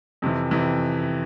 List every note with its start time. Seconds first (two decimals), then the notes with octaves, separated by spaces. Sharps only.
0.22 F2 C3 E3
0.51 F2 C3 E3